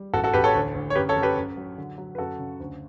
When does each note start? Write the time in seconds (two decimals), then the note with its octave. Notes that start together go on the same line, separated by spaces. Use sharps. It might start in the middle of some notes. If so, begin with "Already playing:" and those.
Already playing: G3
0.14 A1 F#4 A4
0.24 F#4 A4
0.34 A1 G4 B4
0.44 A4 C#5
0.55 D2
0.75 D2
0.90 C#5
0.95 F#2 G4 B4
1.09 A4 C#5
1.16 F#2
1.23 G4 B4
1.37 F#2
1.57 F#3
1.78 D3
1.98 F#3
2.15 B4
2.18 F#2 F#4 A4
2.39 C#3
2.60 D2